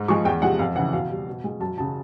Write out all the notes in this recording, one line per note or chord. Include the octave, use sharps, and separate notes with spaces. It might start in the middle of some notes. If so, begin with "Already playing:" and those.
Already playing: G#2
F3 G#3 C#6
E2 G5
C3 F3 G#3 F#5
F2 F5
C#3 E3 F#5
B2 F5
G3
B2
G#3
F#2 A5
C#3 F#3 A5